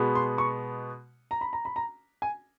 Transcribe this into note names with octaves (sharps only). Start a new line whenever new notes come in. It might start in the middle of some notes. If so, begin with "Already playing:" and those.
Already playing: B2 G#3 B3
C6
C#6
A#5
B5
A#5
B5
A#5
G#5